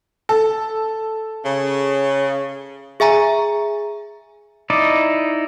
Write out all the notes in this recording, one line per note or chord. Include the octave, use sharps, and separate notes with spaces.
A4
C#3
G#4 E5 G#5 A#5
D#4 E4 D5 D#5